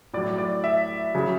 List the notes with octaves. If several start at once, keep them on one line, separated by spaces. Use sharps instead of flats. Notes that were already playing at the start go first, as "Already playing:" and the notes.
A2 F#3 D5
D5
E5
C#3 F#3